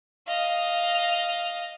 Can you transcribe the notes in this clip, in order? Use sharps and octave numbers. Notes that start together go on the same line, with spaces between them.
D#5 F5